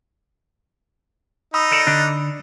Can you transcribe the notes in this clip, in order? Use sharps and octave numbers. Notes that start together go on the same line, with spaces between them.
D#4 B5 D#6 E6
A4 A#4 D5
D3 D4